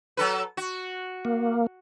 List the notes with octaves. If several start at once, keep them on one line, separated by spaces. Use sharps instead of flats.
F#3 A4 B4
F#4
A#3